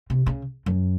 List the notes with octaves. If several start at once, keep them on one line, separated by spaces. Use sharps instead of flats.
C3
C#3
F#2